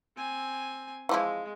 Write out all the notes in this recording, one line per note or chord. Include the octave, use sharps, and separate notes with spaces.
C4 G#5
E3 F3 G#3 E4